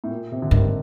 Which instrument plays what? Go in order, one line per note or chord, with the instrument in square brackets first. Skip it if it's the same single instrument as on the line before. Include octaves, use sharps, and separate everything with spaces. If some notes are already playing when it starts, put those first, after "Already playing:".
[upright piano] A2
A#2
C3
D3
[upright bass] G2 [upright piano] D#3